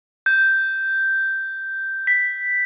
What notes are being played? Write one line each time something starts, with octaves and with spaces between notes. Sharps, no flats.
G6
B6